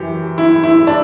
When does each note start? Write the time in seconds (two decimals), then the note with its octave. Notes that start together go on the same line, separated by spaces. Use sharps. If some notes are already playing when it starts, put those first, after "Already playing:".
Already playing: F#2 E3 G4
0.38 E4
0.64 E4
0.87 D4